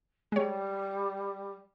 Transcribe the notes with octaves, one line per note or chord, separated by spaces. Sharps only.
G3 G#3 C#5